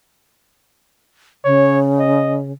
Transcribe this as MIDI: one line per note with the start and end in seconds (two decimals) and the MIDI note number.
1.45 2.52 49
1.45 1.78 73
1.99 2.38 75